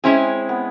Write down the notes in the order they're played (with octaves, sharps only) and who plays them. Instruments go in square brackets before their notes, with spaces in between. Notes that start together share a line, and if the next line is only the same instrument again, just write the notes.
[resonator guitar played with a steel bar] G#3 C#4 E4 G#4 [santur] C4
[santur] B3